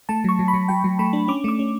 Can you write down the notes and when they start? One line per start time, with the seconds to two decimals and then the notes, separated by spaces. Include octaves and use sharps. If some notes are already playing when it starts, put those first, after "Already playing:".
0.09 A3 A5
0.24 F#3 C#6
0.39 F#3
0.48 B5
0.54 F#3
0.68 F#3 G5
0.84 F#3
0.99 A3 B5
1.13 D4
1.28 C#4 D6
1.44 A3 D6
1.59 C#4